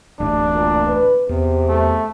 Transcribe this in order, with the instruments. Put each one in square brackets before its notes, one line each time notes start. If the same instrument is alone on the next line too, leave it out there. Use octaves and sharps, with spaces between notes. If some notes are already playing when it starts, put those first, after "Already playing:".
[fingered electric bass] D1 A1 A3 [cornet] D4
[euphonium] A#2
B4
[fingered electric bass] E2 [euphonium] C3
[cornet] A3